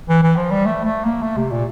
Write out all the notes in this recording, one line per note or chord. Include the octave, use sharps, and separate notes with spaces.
E3
E3
F3
G3
A3
A3
A#3
A3
C3
A#2